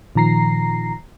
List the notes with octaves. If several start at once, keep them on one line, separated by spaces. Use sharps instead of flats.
A#2 D#3 F3 A#5 A#6 C7